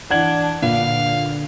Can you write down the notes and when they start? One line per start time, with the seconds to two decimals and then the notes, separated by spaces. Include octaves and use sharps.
0.10 E3 D4 D5 F#5 A5 G#6 F#7
0.62 A#2 D3 B4 D5 F5